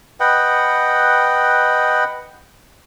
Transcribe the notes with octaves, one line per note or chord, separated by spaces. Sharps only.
B4 D#5 F#5 G5